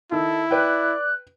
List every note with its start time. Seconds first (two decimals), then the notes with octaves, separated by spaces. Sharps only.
0.12 D#3 E4 A4
0.51 B4 D5 G5 F#6